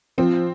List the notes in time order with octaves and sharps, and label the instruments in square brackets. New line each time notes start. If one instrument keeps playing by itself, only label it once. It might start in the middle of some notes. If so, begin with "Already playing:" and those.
[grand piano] F3 [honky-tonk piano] C4